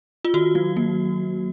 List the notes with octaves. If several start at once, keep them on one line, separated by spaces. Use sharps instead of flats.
F4
D#3 F#4
F#3
A#3